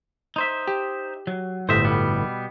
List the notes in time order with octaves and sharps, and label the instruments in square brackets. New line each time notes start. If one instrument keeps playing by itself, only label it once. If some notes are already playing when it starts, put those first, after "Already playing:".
[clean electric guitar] D#4 C5 E5
[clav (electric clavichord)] G4
[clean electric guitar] F#3
[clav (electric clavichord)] G1 A2 [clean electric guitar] C5 D#5 E5
[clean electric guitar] B2 G3 B3